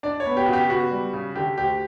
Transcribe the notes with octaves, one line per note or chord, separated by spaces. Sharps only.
D4 D5
C#5
B3
G4
C#3 F#4
G4
B3 F#4
G3
C#3
D3 G4
D2 G4